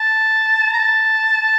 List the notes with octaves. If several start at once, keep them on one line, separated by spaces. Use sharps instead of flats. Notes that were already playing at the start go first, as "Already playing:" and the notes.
Already playing: A5
A#5
A5
A5